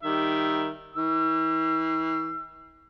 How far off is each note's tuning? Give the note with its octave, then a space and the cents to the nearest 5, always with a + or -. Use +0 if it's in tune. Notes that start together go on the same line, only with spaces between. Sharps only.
D#3 +0 G3 +0 E5 +5
E3 -45 E6 +35